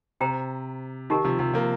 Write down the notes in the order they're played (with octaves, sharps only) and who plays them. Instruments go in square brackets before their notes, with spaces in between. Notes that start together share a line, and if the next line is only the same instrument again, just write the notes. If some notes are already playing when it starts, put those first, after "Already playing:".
[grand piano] C3 [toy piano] C5 G5 A#5
[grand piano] D#3 [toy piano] D#4 G4 A#4
[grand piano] C3 F3
C3 F3
F3 A#3